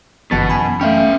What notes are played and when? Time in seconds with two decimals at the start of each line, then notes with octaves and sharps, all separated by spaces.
0.31 G1 F#2 B2 E3 F#5 A5 A6
0.50 G#5 A5 B5
0.81 A3 C#4 E5 F5 G5